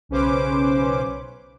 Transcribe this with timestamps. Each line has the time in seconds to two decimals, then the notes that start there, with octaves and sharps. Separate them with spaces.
0.09 B1 C#3 C#4 B4 C5 D6